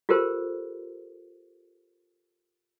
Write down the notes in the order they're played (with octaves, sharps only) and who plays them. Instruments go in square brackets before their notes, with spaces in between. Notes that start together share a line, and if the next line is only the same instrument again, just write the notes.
[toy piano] F4 G4 A4 A#4 C5